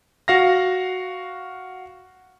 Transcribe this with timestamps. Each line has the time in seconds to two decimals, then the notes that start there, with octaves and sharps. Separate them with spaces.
0.28 F#4 F5 A#6